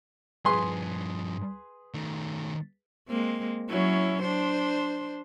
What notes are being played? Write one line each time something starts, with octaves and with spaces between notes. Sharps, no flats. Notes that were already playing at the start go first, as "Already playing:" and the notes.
G2 F3 G#4 B4 C6
D#3 A3
G#3 A#3 C4
F#3 C#4 E4
D4 C5